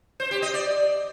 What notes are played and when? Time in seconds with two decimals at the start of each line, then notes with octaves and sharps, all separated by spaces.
0.20 C5
0.31 G4
0.42 D#5
0.54 D5